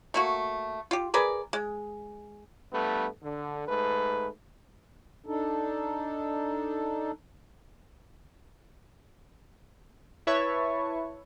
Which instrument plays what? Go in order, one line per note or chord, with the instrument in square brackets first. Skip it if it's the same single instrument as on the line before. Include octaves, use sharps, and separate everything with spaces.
[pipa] A3 A#3 F#4
F4 G4
G#4 A#4 B4 D5
G#3
[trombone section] G2 A3 B3
D3
G#2 A3 B4
[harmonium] D4 D#4 A4
[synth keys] E4 B4 C#5 E5 A5 C#6